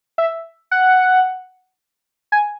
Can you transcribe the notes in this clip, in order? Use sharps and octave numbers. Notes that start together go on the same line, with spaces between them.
E5
F#5
G#5